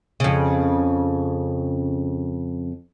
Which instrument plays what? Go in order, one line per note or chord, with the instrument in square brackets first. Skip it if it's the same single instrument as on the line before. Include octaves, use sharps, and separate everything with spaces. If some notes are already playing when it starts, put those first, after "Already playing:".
[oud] F2 C#3